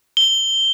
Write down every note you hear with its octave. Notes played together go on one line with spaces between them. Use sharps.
G7